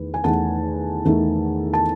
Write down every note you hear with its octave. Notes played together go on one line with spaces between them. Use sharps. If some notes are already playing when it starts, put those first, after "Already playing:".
Already playing: E2 D#3 A3 B4
G#5
E2 D#3 A3 F#5 A5
E2 D#3 A3
A5